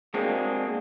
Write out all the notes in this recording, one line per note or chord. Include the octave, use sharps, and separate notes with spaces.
G#3 A#3 C4 D4 F#4 G#4